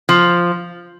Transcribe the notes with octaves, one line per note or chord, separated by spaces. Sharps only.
F3